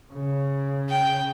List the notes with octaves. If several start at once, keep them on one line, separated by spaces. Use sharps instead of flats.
C#3
G5